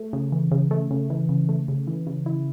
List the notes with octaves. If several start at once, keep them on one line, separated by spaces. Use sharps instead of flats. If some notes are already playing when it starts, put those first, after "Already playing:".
Already playing: A3
C#3
E3
C#3
A3
C#3
E3
C#3
A3
C#3
E3
C#3
E4